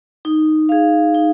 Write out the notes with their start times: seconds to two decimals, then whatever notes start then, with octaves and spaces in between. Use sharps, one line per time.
0.25 D#4
0.69 G#4 F5
1.14 D#4